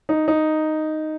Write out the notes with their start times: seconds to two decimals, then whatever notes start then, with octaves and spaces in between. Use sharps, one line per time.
0.09 D#4
0.28 D#4